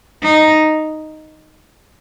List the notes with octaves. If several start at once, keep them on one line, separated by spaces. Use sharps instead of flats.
D#4